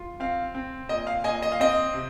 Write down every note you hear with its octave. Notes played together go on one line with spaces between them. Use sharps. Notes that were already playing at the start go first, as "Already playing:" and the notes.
Already playing: F4
C4 F5
C4
A#2 D#5
F5
A#2 D#5 G#5
D#5
F5
C4 D#5
C3